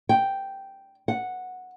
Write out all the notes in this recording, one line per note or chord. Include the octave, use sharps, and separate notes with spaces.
G5
F#5